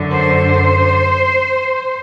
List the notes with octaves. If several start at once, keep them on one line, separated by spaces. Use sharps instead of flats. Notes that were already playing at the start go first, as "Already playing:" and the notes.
Already playing: F#2 D3
C5